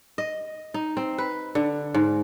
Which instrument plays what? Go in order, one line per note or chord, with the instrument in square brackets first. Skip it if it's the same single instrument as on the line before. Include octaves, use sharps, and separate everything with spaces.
[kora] D#5
D#4
C4
B4
D3
G#2